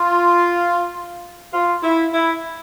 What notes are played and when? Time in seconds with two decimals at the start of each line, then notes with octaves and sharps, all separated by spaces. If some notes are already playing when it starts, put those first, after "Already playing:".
Already playing: F4
1.54 F4
1.83 E4
2.13 E4